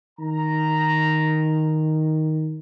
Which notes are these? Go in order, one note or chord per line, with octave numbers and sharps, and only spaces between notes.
D#3 A#5